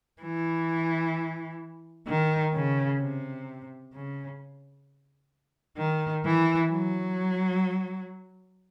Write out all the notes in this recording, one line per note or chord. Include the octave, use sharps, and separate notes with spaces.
E3
D#3
C#3
C3
C#3
D#3
E3
F#3